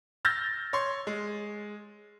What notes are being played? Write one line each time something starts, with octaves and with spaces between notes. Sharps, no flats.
E6 F6 G6 A6 A#6
C#5 C6
G#3